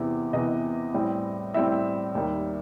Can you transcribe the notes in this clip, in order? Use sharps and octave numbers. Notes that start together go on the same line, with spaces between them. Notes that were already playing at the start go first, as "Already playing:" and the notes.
Already playing: E2 C3 E3 B3
E2 C3 E3 B3 D#5
A2 G3 C4
A2 G3 C4 E5
D#2 D#3 G3